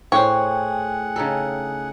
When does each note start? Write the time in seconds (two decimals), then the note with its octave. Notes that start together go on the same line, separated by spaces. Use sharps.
0.12 A2 G#4 C5 C#5 F#5 G5
1.16 C#3 D#4 A4